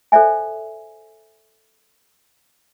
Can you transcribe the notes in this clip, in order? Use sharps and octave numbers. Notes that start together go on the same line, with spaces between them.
A4 C5 D5 E5 G#5